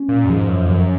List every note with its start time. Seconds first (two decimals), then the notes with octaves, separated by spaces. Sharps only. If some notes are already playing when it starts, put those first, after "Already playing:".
Already playing: C#4
0.09 A#2
0.25 F#2
0.29 G#2 F3
0.49 F#2
0.61 F2
0.69 F#2 F3